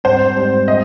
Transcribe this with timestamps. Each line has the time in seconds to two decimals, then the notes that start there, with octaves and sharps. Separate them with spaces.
0.04 G#2 G3 C4 C5
0.36 G#2 G3 C4
0.68 G3 C4 D#5